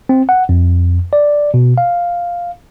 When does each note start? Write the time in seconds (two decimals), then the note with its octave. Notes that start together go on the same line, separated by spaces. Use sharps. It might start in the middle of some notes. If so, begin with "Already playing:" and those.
0.09 C4
0.29 F#5
0.49 F2
1.13 D5
1.54 B2
1.78 F5